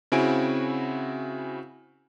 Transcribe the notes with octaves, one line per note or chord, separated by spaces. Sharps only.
C#3 C4 E4 F#4 G#5 D7